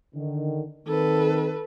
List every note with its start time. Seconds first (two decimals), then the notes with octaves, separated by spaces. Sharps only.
0.15 D3 D#3
0.87 D#3 C4 A4 B4